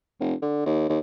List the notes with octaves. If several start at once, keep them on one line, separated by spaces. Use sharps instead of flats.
F1
D3
D#2
D#2